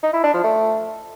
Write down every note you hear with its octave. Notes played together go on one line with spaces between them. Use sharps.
D#4
E4
D4
F3
A3